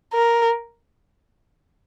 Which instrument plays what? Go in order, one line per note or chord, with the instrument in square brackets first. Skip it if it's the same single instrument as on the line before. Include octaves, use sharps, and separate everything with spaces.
[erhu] A#4